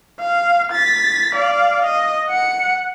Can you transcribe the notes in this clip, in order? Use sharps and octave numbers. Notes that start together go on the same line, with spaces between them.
F5
A6 B6
D5 F5
D#5
F#5 C#7